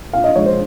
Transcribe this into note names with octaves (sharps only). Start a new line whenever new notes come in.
A#2 F5
D#5
F3 G#3 C#5
C5